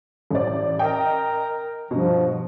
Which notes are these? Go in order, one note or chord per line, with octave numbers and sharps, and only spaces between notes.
A1 D5
A#4 D#5 G5
G2 B2 F3